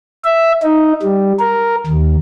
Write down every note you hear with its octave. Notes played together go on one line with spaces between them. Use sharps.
E5
D#4
G3
A#4
D#2